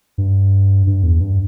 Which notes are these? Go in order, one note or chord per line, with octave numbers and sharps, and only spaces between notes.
G2
G2
E2
G2